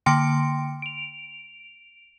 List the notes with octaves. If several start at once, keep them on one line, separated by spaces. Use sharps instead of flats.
D3 A#3 G5 C6 C#7 D7
D7 F7